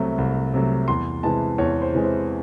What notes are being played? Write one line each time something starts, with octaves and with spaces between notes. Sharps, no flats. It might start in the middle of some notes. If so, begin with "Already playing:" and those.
Already playing: C2 C3 F#3 A3
C2
C3 F#3 A3
E2 C6
C3 E3 G#3 A5
E2 C#5
C5
C3 E3 G#3
C5